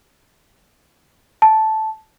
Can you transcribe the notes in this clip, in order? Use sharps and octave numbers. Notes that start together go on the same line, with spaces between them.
A5